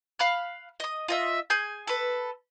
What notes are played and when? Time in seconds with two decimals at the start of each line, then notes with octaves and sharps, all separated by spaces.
0.19 F5 B5 F6 F#6
0.80 D#5 D#6
1.08 F4 D#5 E5
1.50 G#4 G#5 G6
1.87 A4 B4